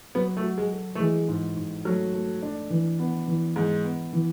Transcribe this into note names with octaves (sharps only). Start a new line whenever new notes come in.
F#3 B3
A3
F#4
G#3
A4
A3
E3 G#3
G#2
G#2
F#3 A3
A3
D4
E3
B3
E3
G#2 E3
B3
E3